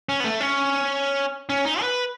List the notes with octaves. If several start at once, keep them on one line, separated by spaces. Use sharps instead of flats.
C#4
B3
A3
C#4
C#4
D#4
B4